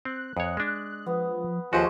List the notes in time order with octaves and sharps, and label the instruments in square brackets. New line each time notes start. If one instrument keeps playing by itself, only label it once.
[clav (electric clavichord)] C4 [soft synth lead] F#6
[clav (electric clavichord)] F2 C#5 [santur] D#5
[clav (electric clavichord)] G#3 D4
[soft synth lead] F3 [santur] B3
[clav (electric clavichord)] D#2 F#4 [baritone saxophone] F3 [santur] G#3 G4 C5 [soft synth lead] C#6